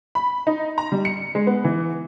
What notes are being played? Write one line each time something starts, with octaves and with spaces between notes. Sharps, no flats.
B5
D#4
A#5
G3
C#7
G#3
B3
E3